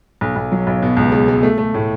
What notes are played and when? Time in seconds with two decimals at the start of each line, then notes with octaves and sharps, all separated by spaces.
0.21 B1
0.36 B1
0.52 F#3
0.67 B1
0.82 B2
0.97 C#2
1.12 G#3
1.28 G#3
1.43 A3
1.58 A3
1.74 A2